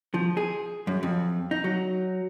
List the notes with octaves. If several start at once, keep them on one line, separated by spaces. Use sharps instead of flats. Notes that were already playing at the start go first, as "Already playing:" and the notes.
F3
G#4
F#2
F2
D#4
F#3